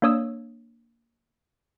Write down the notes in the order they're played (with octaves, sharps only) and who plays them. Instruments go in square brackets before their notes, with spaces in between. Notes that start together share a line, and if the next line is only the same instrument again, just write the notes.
[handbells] A#3 D4 C#5 D#6 E6